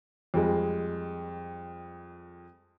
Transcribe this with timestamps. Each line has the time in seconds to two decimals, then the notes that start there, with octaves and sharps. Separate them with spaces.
0.34 F2 G3 G#3